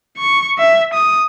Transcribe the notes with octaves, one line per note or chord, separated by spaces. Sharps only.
C#6
E5
D#6